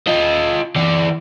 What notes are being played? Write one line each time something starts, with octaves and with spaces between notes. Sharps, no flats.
F4 D#5
E3 D5